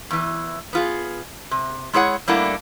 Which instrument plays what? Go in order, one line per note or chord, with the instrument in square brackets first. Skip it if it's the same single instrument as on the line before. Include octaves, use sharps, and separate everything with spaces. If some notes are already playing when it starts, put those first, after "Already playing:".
[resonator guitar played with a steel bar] E2 E3
B3 F4 G#4
C3
G#3 E4 G#4 C#5 F#5
G3 A3 A#3 D4 E4 F#5